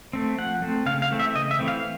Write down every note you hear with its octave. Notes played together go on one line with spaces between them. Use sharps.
A3 C4
F3 F#5
A3 C4
C#3 F5
F5
E3 A3 C4
E5
C#3 D#5
E5
E3 A3 C4
F5